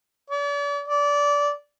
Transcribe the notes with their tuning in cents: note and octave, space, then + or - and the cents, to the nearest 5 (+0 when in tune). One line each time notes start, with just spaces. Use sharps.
D5 -40
D5 -20